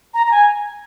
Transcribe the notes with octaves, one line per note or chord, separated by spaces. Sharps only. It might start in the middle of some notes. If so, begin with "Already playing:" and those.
A#5
A#5
G#5